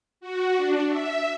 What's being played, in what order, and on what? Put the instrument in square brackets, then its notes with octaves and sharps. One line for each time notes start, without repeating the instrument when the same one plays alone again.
[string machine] F#4
D4
E5